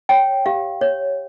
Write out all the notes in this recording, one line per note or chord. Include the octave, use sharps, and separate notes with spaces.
C#5 G5
G4 F5
C#5